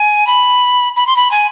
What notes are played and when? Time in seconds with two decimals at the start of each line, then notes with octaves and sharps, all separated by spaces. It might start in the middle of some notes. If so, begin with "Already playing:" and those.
Already playing: G#5
0.27 B5
0.96 B5
1.07 C6
1.16 B5
1.31 G#5